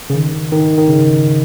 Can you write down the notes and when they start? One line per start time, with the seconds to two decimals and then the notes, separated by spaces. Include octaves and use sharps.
0.10 C#3
0.14 D#3
0.52 D#3
0.78 D#3
0.88 C#3